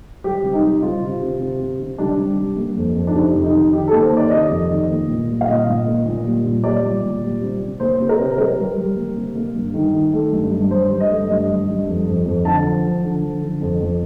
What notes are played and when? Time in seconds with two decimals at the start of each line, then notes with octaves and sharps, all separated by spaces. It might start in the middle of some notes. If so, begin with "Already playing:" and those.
0.24 G3 G4
0.44 C3
0.53 D#4
0.63 G3
0.82 C3 F4
1.02 C3
1.21 C3
1.40 C3
1.60 C3
1.80 C3
1.98 G3 D4
2.18 C3
2.38 G3
2.57 A#3
2.76 F2
2.95 F2
3.07 D4
3.15 C3 D#4
3.34 F2
3.45 D#4
3.53 D#3
3.73 D#3 G4
3.88 A#3 A4
4.02 C5
4.12 D#3
4.17 D5
4.31 C3 D#5
4.50 F2
4.69 D#3
4.90 A#3
5.08 A#2
5.28 G3
5.41 F5
5.48 A#2 D#5
5.67 A#2
5.86 A#3
6.06 A#2
6.25 G3
6.44 A#2
6.64 G3 D5
6.83 A#2
7.03 A#2
7.22 G3
7.41 C3
7.61 C3
7.80 A#3 C5
8.00 C3
8.09 A#4
8.19 C3
8.38 G3 A#4
8.57 G3
8.78 G3
8.96 A#3
9.16 C3
9.35 A#3
9.55 G2
9.74 D#3
9.93 D#3
10.13 A3
10.32 G2
10.51 G2
10.71 G2 C5
10.90 G2
11.00 D#5
11.10 A3
11.28 G2 D#5
11.48 G2
11.68 G2
11.87 F2
12.06 F2
12.26 F2
12.45 D3 A5
12.65 F3
12.84 F3
13.03 D3
13.23 F3
13.42 D3
13.61 F2
13.81 F2